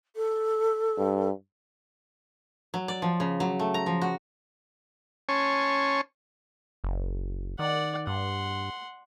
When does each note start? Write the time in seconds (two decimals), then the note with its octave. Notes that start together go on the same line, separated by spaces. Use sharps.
0.15 A4
0.98 G2
2.74 F#3
2.88 D5
3.02 F3
3.20 C#3
3.40 F#3
3.59 A3
3.74 A#5
3.86 F3
4.01 F#4
5.29 C#4 C#5 G#5 A5 C6 C#6
6.84 F#1
7.59 D#3 D5 F#5
8.07 G2 F#5 C6